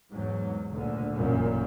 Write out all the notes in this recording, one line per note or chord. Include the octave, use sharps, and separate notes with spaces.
E2 G#2 F#3
D2 A#2 D3
A1 F#2 A#2